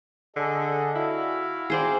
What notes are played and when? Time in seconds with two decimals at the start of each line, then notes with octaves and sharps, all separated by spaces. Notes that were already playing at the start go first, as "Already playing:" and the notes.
0.36 D3 G#4 A4 D#5
0.95 E4 F#4 F5
1.70 C4 D#4 F#4 G#4 C5 D5